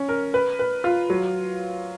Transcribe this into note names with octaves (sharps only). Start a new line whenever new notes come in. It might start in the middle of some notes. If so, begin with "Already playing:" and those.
Already playing: C#4
A#4
B4
B4
F4
F#3